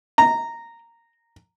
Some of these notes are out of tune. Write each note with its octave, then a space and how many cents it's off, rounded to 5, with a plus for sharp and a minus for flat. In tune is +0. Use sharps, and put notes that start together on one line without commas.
A#5 -10